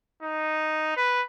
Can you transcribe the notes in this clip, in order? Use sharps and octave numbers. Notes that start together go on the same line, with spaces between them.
D#4
B4